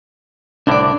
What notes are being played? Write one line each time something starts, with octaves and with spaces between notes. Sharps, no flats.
C2 A2 D3 D4 D5